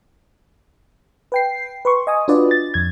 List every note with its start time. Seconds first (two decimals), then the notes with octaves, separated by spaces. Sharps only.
1.32 B4 G5 C7
1.85 B4 C6 C#6
2.07 D#5 G#5 D#6
2.28 D4 F4 F#4 B4 D5
2.51 A6
2.74 F2 G#6